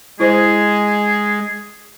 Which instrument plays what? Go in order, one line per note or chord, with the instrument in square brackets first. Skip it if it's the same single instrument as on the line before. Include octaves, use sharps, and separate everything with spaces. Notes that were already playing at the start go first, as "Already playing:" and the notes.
[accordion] G#3 [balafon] E4 C5 [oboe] G#4